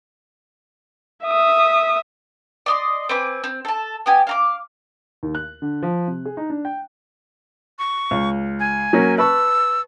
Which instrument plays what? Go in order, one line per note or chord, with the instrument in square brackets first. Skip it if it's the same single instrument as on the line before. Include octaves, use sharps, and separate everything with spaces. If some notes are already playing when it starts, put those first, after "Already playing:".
[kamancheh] E5 D#6
[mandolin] D5 D#5 C6
C4 B4 G#5 D6
C4
A4 A5
B3 G4 G#5
F5 A#5 D6
[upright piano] D#2
F#6
D3
F3
C3
G#4
D#4
D4
G5
[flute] C#6
[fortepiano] C#2
[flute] G#5
[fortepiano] F#3 A#3 C#4
[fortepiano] B4 A5 C#6 [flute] E6